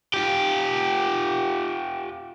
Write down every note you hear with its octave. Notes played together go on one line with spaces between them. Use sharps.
F4 G4